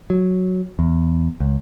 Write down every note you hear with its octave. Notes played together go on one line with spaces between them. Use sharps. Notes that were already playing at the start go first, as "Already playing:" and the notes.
F#3
E2
C#2